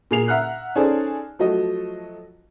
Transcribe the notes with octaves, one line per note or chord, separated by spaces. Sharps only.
A#2 A#3 G#4 C7 F7
E5 F#5 A#5 F6 F#6
C#4 D#4 G#4 A4 C5 D5
F3 F#3 A3 F#4 D#5